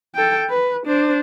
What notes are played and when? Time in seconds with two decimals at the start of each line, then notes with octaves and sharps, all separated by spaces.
0.15 A4 G5
0.49 B4
0.86 D4 C5